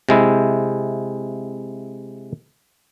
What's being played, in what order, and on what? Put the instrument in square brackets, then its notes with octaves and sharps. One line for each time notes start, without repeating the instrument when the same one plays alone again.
[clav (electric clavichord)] C3 G#3 E4